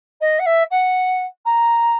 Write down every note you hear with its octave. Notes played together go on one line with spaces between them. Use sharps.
D#5
F#5
E5
F#5
A#5